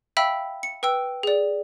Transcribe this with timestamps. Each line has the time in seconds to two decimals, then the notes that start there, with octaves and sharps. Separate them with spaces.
0.17 E5 F5 G5 B5 E6 B6
0.63 C#7
0.83 B4 G5 E6 D7
1.23 G#4 D5